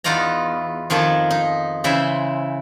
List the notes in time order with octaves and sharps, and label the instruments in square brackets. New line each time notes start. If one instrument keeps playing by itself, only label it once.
[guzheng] E2 B3 D#4 F4 D5 A#5
F2 D#3 F3 G#4 A5
D#4
C#3 E3 E4 C5 E5